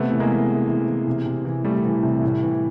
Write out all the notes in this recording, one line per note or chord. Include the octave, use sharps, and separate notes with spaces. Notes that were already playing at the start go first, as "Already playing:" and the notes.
Already playing: C3 A3 B3
E3
G#3 A#3
E3
E3
E3
E3
C3
C3
E3
E3 G3 A3
E3
C3
A2
E3